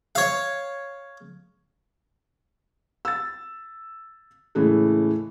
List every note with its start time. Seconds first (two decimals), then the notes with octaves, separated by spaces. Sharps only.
0.15 C#5 F5
3.05 E6 A6
4.55 A2 C#3 E3 G#3 A3